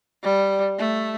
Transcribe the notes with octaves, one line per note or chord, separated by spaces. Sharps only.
G3
A3